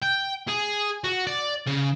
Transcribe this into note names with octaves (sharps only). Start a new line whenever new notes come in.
G5
G#4
F#4
D5
C#3